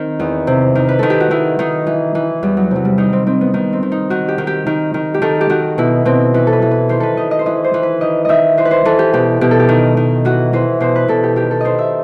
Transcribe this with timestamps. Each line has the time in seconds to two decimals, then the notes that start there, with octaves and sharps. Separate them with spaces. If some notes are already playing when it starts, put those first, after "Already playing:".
Already playing: D#3 C4 D#4
0.20 E2
0.47 C3
0.75 D#3
0.89 B4
0.99 D#3 A4
1.10 G4
1.20 F#4
1.31 D#3 E4
1.59 D#3 D#4
1.87 E3
2.15 E3
2.43 E2 G3
2.57 F#3
2.71 C3 F#3
2.85 G3
2.98 D#3 D#4
3.13 C4
3.26 D#3 C4
3.41 B3
3.54 D#3 B3
3.73 C4
3.83 D#3
3.92 D#4
4.10 D#3 F#4
4.28 G4
4.38 D#3
4.47 G4
4.66 D#3
4.94 D#3
5.14 G4
5.22 D#3 A4
5.41 G4
5.50 D#3 F#4
5.78 B2 E4
6.05 B2 C4
6.34 E3 B4
6.47 A4
6.53 B4
6.62 E3
6.71 B4
6.89 D#3 C5
7.00 A4 B4
7.17 D#3 D#5
7.31 D#5
7.39 C5
7.46 E3 D#5
7.64 C5
7.74 E3
7.83 B4
8.01 D#3 D#5
8.25 D#3 D#5 E5
8.57 E3 C5
8.65 B4
8.71 C5
8.85 E3 A4
8.99 G4
9.13 B2 G4
9.41 B2 G4
9.51 A4
9.59 G4
9.69 D#3
9.97 D#3
10.25 E3 F#4
10.53 E3 C5
10.80 B2 C5
10.96 B4
11.08 B2 A4
11.23 G4
11.36 D#3 G4
11.51 A4
11.61 D#3 C5 D#5
11.79 E5